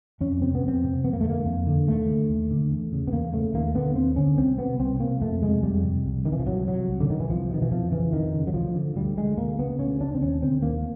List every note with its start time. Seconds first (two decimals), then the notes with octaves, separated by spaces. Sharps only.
0.21 F2 C#4
0.41 C3 C4
0.55 B3
0.63 F2
0.68 C4
0.84 C3
1.04 F2 B3
1.13 A#3
1.21 A3
1.25 D3 A#3
1.45 F2
1.67 D3
1.87 D#2 A3
2.09 D3
2.29 D#2
2.51 D3
2.71 E2
2.92 C#3
3.07 B3
3.12 E2 A#3
3.33 C#3 A3
3.54 D#2 A#3
3.75 D3 B3
3.96 D#2 C4
4.16 D3 C#4
4.37 C2 C4
4.58 C3 B3
4.79 C2 C4
5.00 C3 A#3
5.21 F2 A3
5.42 C3 G#3
5.63 F2 G3
5.84 C3
6.05 C2
6.25 C3 D#3
6.32 E3
6.39 F3
6.47 C2 F#3
6.67 C3 F#3
6.88 C2
7.01 D3
7.09 B2 D#3
7.20 E3
7.30 C2 F3
7.50 B2 D#3
7.62 E3
7.71 F2 F3
7.92 C#3 E3
8.13 F2 D#3
8.34 C#3
8.47 F#3
8.54 D2 F3
8.75 D3
8.96 D2 G3
9.17 D3 G#3
9.38 D2 A#3
9.59 C#3 B3
9.79 D2 C#4
10.00 C#3 D4
10.14 C4
10.21 D#2 C#4
10.42 D3 C4
10.62 D#2 A#3